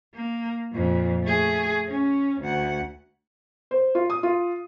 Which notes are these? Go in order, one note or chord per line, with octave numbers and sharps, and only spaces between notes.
A#3
F2 A#2
A3 G#4
C#4
D2 F#5
C5
F4
D#6
F4